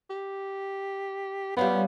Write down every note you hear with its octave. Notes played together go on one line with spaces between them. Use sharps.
G4
G3 B3 C#4 F4